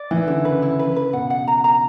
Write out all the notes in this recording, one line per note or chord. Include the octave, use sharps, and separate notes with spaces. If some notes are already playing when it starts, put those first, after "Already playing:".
Already playing: D5
E3 E4
D3 E4
C#3 B4
E4
B4
B4
B2 F#5
F#5
A#5
A#5